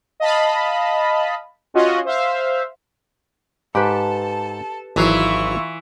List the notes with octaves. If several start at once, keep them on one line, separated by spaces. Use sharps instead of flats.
D#5 F5 A5 B5
C#4 F4 F#4 D#5
C5 E5 F5
G#2 G4 A4 B4 A5
G#1 E3 F#3 E4 F4 F5 C#6